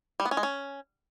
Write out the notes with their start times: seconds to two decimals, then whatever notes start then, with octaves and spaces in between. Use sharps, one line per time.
0.20 G3
0.25 B3
0.31 C#4
0.37 G#3
0.43 C#4